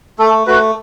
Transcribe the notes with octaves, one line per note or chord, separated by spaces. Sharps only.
A3 A4
A3 F#4 B4